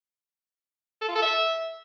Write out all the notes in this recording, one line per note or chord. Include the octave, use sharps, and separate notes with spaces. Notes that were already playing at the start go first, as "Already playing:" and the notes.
A4
F4
A4
E5